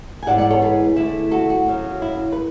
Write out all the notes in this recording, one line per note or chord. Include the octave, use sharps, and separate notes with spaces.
G#5
G#2 E3 G#3 B3 D5 F#5
D5 F#5
A4 C#5
G#4 B4
D3 A3 E4
F#4 A4
F#4
F#2 C#3 F#3
E4
B4